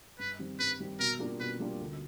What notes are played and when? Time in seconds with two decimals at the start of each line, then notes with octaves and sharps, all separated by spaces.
0.19 G2 B4
0.39 D#3 G3 C4
0.59 G2 B4
0.80 D#3 G3 C4
1.00 B2 A#4
1.19 G3 A#3 D4 F4
1.40 B2 B4
1.60 G3 A#3 D4 F4
1.80 D2